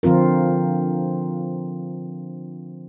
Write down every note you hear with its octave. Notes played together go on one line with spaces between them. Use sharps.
D3 F3 C4 F4 A#4